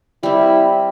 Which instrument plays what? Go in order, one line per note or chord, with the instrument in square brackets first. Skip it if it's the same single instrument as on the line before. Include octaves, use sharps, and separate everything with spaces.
[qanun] G3 C4 [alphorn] E4